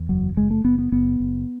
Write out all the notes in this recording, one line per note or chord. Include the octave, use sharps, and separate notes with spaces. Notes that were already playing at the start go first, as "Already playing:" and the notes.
Already playing: E2
F#1 F#3
F#1 G#3
A3
F#1 B3
B3
F#1 B3
F#1